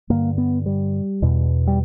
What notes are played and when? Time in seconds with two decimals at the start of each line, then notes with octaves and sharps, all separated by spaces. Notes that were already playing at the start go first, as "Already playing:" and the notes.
0.10 G2 D3 A#3
0.38 B3
0.66 G3
1.22 E2 B2
1.67 G3